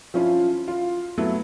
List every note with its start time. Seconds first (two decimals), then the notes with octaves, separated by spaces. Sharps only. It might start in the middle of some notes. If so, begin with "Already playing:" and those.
0.14 F3 C#4 E4 F4
0.68 F4
1.18 F#3 A3 B3 E4